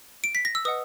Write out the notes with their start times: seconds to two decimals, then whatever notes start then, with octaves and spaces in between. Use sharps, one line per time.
0.24 D7
0.35 B6
0.45 A#6
0.55 E6
0.65 B4 D#5 F#5 D#6